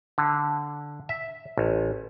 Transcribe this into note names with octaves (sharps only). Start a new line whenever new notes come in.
D3
E5
A1